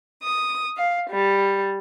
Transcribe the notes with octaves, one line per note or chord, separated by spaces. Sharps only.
D#6
F5
G3